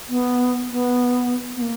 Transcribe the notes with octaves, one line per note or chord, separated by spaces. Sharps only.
B3
B3
B3
A#3